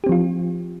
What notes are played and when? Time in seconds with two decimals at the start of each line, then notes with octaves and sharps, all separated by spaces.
0.04 G4
0.06 C4
0.09 F3
0.12 F4